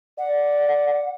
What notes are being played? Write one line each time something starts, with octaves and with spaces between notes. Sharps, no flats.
D5 F#5